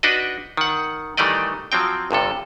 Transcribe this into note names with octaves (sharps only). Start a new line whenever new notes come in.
D4 D#4 F#4 B4 D5 D#5
D#3 F#5
D#3 E3 G3 A3 D5 D#5
F3 F#3 C4 G5
G1 G2 C3 A4